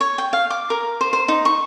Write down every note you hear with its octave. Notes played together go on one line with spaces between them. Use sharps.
C#5
G5
F5
D6
A#4
C5
C5
D#4
C#6